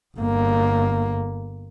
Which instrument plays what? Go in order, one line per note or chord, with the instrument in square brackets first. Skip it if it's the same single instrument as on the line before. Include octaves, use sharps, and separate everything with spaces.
[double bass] G1 A#3